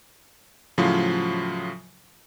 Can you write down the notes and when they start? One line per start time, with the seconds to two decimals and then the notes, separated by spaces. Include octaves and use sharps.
0.78 A2 C#3 F3 F#3 F4